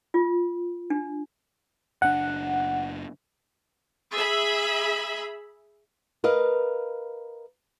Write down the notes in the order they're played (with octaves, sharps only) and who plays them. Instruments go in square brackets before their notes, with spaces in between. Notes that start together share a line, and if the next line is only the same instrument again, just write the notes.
[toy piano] F4
D4
[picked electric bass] F#1 D4 [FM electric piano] F#5
[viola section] G#4 E5 B5
[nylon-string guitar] A#4 B4 D#5 F5